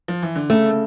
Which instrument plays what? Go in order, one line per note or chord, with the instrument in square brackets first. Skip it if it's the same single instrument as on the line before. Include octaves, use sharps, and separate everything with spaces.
[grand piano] F3
E3
D3
[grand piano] C#3 [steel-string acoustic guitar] A3